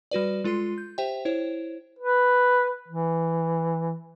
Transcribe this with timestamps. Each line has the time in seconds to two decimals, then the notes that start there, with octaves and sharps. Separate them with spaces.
0.11 G3 F#4 B4 D5
0.44 G#3 F4 A4 C6 C7
0.78 G6
0.98 G4 C5 E5 G5
1.25 E4 C5 C#5
1.99 B4
2.88 E3